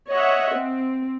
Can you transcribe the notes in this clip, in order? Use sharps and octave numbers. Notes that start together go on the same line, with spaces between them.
C#5 D#5 E5 F#5
C4